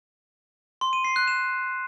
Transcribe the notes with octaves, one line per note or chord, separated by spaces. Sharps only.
C6
D#7
C7
F#6
E7